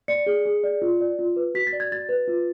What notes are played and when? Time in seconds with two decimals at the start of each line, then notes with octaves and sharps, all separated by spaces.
0.08 D5 C#7
0.26 G#4
0.46 G#4
0.64 D5
0.82 F4
1.01 D5
1.19 F4
1.36 B4
1.55 F#4 B6
1.67 A6
1.73 D5
1.80 G#6
1.91 F#4 A6
2.09 B4
2.28 F4